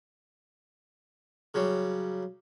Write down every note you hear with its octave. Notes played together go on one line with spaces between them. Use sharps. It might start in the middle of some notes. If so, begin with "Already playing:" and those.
C#3 F#3 G3